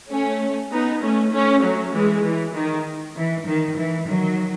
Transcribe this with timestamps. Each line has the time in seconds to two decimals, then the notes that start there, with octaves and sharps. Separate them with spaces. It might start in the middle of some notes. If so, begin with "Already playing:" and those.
0.10 A3 C#4
0.71 B3 D#4
1.02 A3 C#4
1.32 A3 C#4
1.63 F#3 A3
1.94 E3 G#3
2.24 E3
2.55 D#3
3.16 E3
3.47 D#3
3.77 E3
4.07 D#3 F#3